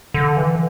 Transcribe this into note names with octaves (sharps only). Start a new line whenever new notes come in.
D3
E3